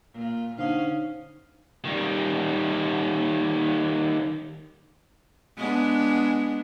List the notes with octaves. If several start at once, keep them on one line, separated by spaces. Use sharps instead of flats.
A#2 F4
D3 C#4 D#4 C5 F5
D#3 G3
G#3 B3 D4